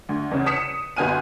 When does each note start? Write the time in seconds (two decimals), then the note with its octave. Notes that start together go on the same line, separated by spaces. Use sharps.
0.09 D2
0.31 E2 C#3
0.46 D#6 B6 C#7 E7
0.96 G1 B2 B4 G#5 F6 D#7